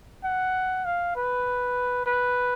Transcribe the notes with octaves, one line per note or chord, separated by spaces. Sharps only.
F#5
F5
B4
B4